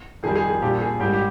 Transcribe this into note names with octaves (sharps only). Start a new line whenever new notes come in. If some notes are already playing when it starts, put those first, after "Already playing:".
F2 D#3 G3 G#4
G#4
G#4
A#1 A#2 G3 C4 G4
G#4
G#2 G3 C#4 G4
G4